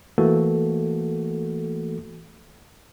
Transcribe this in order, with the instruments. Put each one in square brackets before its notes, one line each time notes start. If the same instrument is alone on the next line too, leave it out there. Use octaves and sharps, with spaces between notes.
[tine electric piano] E3 A3 A#3 F#4 A4